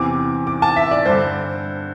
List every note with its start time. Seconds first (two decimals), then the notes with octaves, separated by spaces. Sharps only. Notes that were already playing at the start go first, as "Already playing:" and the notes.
Already playing: E2 C3 E3 D6
0.47 D6
0.62 A5
0.76 E5
0.91 D5
1.06 G2 D3 C5